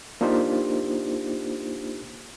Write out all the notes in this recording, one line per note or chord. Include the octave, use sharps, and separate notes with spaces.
A#3 D4 D#4 F4 G4 C5